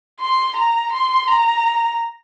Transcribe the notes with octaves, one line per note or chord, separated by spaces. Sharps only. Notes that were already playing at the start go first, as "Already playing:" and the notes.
C6
A#5
C6
A#5